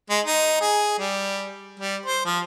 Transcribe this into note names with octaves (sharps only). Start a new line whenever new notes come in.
G#3
D#4
G#4
G3
G3
C5
F3